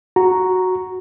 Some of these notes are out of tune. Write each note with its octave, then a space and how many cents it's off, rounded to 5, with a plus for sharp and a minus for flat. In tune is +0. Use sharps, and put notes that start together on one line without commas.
F#4 +0 A#5 +0